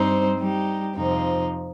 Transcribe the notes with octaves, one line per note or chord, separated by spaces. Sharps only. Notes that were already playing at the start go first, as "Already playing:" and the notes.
Already playing: G2 G3 C4 D#4 C5
G3 D#4 G4
F2 C3 F3 C4 D#4